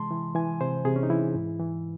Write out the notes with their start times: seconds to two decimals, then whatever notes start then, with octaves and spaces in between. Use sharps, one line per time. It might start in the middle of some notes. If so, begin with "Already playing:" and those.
Already playing: C3 E3 G#3 A5 C6
0.11 E3
0.35 E3 G#5
0.61 C3 C5
0.85 C3 G#4
0.96 C#4
1.03 D#4
1.10 E3 E4
1.35 G#2
1.59 E3